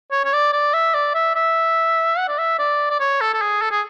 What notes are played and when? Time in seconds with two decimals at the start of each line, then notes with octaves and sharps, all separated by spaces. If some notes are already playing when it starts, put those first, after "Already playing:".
0.12 C#5
0.25 C#5
0.33 D5
0.53 D5
0.74 E5
0.94 D5
1.15 E5
1.35 E5
2.18 F#5
2.28 D5
2.39 E5
2.59 D5
2.91 D5
3.00 C#5
3.21 A4
3.34 A4
3.42 G#4
3.62 A4
3.72 G#4